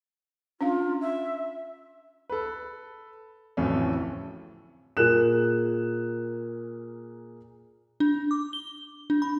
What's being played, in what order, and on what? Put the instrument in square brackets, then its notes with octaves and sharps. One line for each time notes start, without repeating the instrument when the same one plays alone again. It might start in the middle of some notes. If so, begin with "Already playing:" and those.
[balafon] C#4 D4 F5 [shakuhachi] F4
[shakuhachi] E5
[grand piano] A4 B4
D1 A1 F2 A3 C#4
A#2 G#4 A#4 F#6 E7
[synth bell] D4
D6
G7
D4
B5